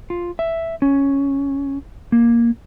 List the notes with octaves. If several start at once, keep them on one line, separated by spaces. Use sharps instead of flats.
F4
E5
C#4
A#3